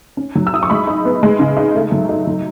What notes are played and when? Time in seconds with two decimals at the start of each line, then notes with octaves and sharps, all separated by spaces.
0.17 C#4
0.35 F#3
0.47 E6
0.53 E4 D#6
0.63 C#6
0.70 G#3 B5
0.87 D#4
1.05 B3
1.23 G#3
1.39 C#3
1.57 D#4
1.75 A3
1.92 F#3
2.09 D#4
2.27 F#3